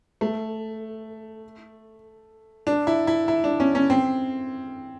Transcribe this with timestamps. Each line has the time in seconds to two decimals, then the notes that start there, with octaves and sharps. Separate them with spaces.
0.21 A3
2.67 D4
2.87 E4
3.07 E4
3.28 E4
3.44 D4
3.60 C#4
3.75 C#4
3.90 C4